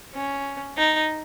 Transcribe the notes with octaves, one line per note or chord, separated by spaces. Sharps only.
C#4
D#4